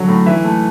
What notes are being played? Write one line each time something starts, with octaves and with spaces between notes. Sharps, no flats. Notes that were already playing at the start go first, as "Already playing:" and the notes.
Already playing: D3 F#3
A2
E3 E5
A3